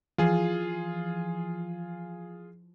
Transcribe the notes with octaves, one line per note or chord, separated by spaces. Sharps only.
E3 F3 F4 G#4